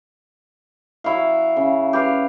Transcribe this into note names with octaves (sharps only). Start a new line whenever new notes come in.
F#3 E4 F#4 F5
C#3
G4 B4 F5